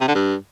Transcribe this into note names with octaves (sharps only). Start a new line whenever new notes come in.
C3
D3
G2